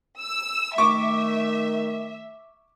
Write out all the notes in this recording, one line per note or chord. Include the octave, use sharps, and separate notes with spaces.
E6
D#3 A3 E5 C#6 D6